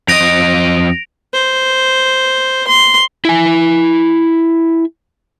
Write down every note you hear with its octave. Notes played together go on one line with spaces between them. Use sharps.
F2 D#5 A#6 D7 F7
C5
C6
E4 G#5